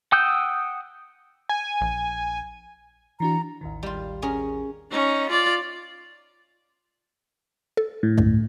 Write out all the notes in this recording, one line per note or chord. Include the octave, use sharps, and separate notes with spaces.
F#5 G5 D#6 E6 G6
G#5
A#1
E3 D4 F#4 A#5
A1 D#2 D#3
G3 F4
C#4 G#4 A#4
C#4 D#4
F4 D5
A4
A2
C#2 G2 D3